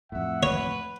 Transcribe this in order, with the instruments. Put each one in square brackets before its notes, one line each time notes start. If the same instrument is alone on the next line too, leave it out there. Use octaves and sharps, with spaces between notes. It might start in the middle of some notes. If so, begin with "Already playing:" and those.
[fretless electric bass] F2 A2 [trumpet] E5 [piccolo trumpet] F#5
[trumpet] B4 [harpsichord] C#5